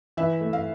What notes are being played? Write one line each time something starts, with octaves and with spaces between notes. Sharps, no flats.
E3 E5
A3
F5